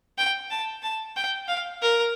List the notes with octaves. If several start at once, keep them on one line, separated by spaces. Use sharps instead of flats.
G5
A5
A5
G5
F5
A#4